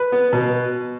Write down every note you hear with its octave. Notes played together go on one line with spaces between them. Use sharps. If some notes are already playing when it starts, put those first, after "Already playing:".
Already playing: B4
B3
B2